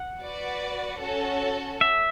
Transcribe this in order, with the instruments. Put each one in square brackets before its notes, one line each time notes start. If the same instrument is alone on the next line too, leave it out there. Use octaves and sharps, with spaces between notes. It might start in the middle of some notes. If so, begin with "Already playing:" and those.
Already playing: [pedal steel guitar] F#5
[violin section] F#4 B4 D5
C#4 F#4 A4
[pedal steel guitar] E5